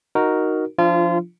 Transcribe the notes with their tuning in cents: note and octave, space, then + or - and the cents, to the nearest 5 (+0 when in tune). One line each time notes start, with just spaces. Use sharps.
D#4 +0 F#4 +0 A#4 +0
F3 +0 D4 +0 F4 -30